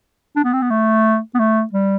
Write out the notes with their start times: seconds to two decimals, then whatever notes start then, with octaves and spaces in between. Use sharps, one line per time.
0.36 D4
0.45 B3
0.53 C4
0.62 B3
0.70 A3
1.35 B3
1.39 A3
1.73 G3